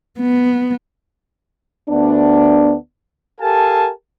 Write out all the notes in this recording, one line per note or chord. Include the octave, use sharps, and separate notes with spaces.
B3
D2 B3 D4
G4 A4 A#4 F5 G#5 A5